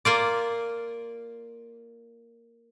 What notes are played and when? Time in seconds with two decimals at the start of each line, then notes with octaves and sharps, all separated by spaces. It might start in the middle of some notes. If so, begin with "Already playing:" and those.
0.05 A#3 F4 D5